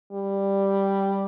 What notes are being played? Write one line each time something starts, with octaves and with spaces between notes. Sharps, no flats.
G3